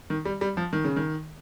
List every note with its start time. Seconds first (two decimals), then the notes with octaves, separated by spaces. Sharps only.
0.10 D#3
0.25 G3
0.41 G3
0.57 F3
0.73 D#3
0.84 C#3
0.96 D#3